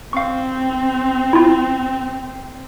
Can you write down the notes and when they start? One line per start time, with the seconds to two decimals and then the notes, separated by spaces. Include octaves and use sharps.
0.13 C4 F5 C#6
1.33 E4 F4